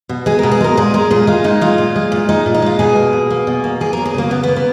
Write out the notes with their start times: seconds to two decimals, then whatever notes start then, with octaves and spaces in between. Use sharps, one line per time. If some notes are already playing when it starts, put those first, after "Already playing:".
0.09 B2
0.26 G#3 G#4
0.39 B2 A#4
0.52 G#4
0.60 G#3 A#4
0.77 A#2 G#4
0.94 G#3 A#4
1.11 A#2 G#4
1.27 G#3 F4
1.44 A#2 D#4
1.61 G#3 F4
1.78 A#2
1.96 G#3
2.12 A#2
2.29 G#3 D#4
2.46 A#2
2.54 D#4
2.62 G#3 F4
2.79 B2 G#4
2.96 A#3
3.13 B2
3.30 A#3
3.47 B2
3.64 A#3
3.80 A#3 G#4
3.93 F#3 A#4
4.05 G#4
4.14 C#3 A#3
4.31 C#3 B3
4.43 B3
4.48 A#3
4.56 B3